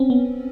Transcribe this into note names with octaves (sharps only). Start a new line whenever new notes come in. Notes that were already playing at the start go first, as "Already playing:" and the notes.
Already playing: C4 C#4
B3